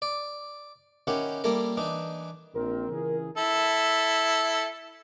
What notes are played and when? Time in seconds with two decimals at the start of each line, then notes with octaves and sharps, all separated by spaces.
0.02 D5
1.07 D#3 C#4 E4 G4 F#5
1.44 G3 A#3 E4 A4 A#4
1.77 E3 D4 D#4
2.55 A#1 C4 A#4
2.89 C#3 E3 G#4
3.36 E4 A4